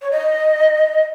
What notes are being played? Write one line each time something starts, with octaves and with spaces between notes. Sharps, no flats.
C#5
D#5